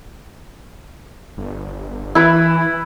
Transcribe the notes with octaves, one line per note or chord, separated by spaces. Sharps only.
G1
E3 E4 B4